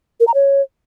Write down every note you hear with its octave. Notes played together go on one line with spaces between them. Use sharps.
A#4
A#5
C#5